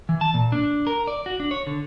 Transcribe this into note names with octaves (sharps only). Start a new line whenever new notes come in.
E3
A5
A#2
D4
A#4
D5
F#4
D4
C#5
D3